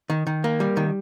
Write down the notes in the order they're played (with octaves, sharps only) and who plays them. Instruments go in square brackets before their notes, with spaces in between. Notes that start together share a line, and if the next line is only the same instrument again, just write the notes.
[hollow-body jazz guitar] D#3
D#3
A#3
G3
D#3